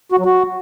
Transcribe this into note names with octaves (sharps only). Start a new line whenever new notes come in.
F#4
F#3
F#4